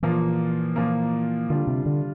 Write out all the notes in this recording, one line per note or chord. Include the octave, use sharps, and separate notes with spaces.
A#2 E3 F3 A#3
A#2 F3 A#3
D3 G3 D4 F4
C3
D3